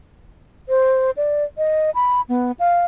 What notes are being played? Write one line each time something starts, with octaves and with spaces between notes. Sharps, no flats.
C5
D5
D#5
B5
B3
F5